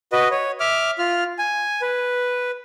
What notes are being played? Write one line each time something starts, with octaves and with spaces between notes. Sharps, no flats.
F#4 B4 D#5
C#5
E5 D6 F6
F4 F6
G#5
B4